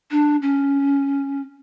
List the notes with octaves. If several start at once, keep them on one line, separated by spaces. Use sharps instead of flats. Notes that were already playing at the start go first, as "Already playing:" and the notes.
D4
C#4